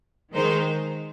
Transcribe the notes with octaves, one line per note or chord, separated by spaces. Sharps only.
D#3 G#3 D#4 C5